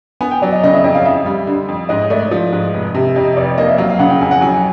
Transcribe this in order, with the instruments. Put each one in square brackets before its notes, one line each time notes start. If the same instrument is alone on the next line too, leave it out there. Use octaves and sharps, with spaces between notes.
[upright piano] B3 [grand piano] G#5
[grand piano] G5
[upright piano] F#3 [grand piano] D5
[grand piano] D#5
[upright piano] C#3 [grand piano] D#5
[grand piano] E5
[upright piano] F2 [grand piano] D#5
[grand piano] F5
[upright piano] F2 [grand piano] E5
[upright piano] G3
D3
F2
[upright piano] G#2 [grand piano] D#5
[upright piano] A3 [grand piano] D5
[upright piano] F3
G#2
F1
C3
[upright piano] F2 [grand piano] D#5
[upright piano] F1 [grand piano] D5
[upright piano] A#3 [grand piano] D#5
[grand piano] E5
[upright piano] F#3 [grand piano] F5
[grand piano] F5
[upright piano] C#3 [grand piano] F#5
[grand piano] G5
[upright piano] F2 [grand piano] G#5
[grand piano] F#5
[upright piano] F#3 [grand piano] G#5